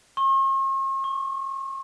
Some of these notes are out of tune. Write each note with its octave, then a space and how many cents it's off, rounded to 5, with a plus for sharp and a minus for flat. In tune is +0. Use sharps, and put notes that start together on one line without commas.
C#6 -45
C#6 +20